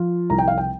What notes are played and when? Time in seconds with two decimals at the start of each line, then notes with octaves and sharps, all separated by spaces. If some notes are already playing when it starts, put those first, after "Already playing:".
Already playing: F3 F4
0.30 C2 A#5
0.38 G5
0.48 F5
0.58 G5